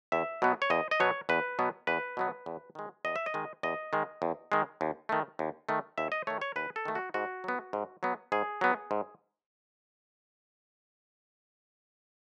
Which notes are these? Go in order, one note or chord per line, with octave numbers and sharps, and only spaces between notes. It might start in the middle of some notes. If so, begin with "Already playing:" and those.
E2 E5
B2 F#3 B3
C#5
E2 D#5
D#5
B2 F#3 B3 C#5
E2 B4
B2 F#3 B3
E2 B4
B2 F#3 B3
E2
D#3 G#3
E2 D#5
E5
D#5
D#3 G#3
E2 D#5
D#3 G#3
E2
D#3 G#3
D#2
D#3 A3
D#2
D#3 A3
D#2 E5
D#5
D#3 A3 C#5
C#5
D#2 B4
A4
D#3 A3
F#4
G#2 F#4
F#3 B3
G#2
F#3 B3
G#2 G#4
F#3 B3
G#2